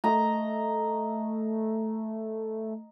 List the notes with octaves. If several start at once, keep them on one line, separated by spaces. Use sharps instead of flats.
A3 D#5 A#5